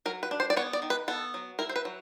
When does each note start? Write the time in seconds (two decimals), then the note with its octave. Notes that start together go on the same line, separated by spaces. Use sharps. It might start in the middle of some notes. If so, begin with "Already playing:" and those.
0.06 F#3 A#4
0.23 B4
0.31 D4
0.40 C5
0.50 D5
0.56 B3 C#5
0.73 D5
0.82 D#3
0.90 B4
1.08 B3 A4
1.34 F#3
1.59 E4 A#4
1.69 C5
1.76 B4
1.85 F#3